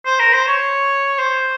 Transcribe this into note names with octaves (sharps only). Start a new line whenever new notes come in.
C5
A#4
C5
C#5
C5